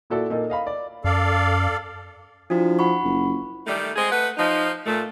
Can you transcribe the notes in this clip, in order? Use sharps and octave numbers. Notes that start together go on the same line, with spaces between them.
A#2 E4 F#4 A4 D5
A#2 A#3 D#4 A4
D#5 F5 B5
D5
F#2 A4 D5 F5
F3 D4 E4 F#4
F#5 B5 C#6
F#1
D#3 G3 A3
G#3 C4 G#4
A3 B4 F#5
F3 D#4
A#2 A3